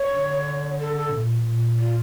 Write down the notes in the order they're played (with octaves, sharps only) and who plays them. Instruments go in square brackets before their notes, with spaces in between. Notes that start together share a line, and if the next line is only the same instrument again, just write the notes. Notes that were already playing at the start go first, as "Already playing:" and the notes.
Already playing: [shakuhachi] C#5
[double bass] D3
[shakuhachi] A4
A4
[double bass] A#2
A#2
[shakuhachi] F4